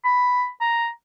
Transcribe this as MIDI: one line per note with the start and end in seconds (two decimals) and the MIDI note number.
0.04 0.48 83
0.61 0.88 82